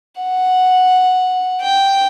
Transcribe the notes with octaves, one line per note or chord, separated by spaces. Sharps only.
F#5
G5